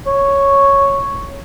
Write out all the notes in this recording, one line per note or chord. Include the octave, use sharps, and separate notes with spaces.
C#5